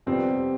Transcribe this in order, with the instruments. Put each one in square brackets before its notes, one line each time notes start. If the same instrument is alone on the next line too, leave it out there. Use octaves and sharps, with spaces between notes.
[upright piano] F2 C3 G3 B3 [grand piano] C4